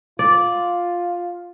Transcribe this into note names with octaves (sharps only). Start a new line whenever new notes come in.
F4 D5